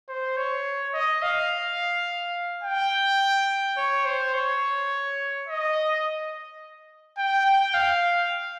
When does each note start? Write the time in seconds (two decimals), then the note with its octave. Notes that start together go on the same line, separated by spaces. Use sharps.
0.09 C5
0.37 C#5
0.94 D#5
1.22 F5
2.64 G5
3.77 C#5
4.05 C5
4.34 C#5
5.47 D#5
7.17 G5
7.45 G5
7.74 F5